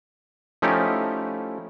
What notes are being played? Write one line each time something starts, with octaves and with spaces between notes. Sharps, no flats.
F3 A3 C#4 D#4 E4 G4